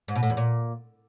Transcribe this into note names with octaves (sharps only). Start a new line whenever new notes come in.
G#2
B2
A2
E2
A#2